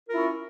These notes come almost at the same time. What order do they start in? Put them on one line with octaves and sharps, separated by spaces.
A#4 F4 E4 C#4